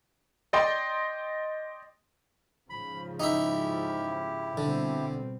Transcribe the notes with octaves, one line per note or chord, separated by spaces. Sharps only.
D5 D#5 G5 C6
G#2 C#3 F3 B5
D#4 E4 G4 E5
B2 D3 G3 C4